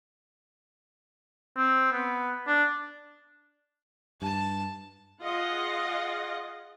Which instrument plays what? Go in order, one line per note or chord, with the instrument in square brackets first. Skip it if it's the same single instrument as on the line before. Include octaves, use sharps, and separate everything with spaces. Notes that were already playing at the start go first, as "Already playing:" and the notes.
[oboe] C4
B3
D4
[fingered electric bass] G2 [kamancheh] A5
[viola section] F4 G#4 D#5 F#5